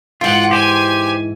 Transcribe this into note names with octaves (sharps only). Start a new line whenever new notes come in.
G#2 E3 F4 F#5 G5
G4 C5 G#5